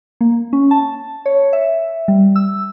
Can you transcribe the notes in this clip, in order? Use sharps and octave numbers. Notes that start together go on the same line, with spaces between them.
A#3
C#4
A5
C#5
E5
G3
E6